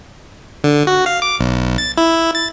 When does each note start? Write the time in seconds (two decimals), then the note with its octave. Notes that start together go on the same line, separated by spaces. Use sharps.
0.64 D3
0.87 F#4
1.06 F5
1.22 D6
1.39 B1
1.78 A6
1.98 E4
2.35 A6